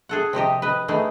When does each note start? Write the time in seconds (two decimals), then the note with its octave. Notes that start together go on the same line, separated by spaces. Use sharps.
0.09 G#4 A4 F#5
0.33 C3 F3 G4 D#5
0.62 B4 D#5
0.88 E3 A3 D#4 G#4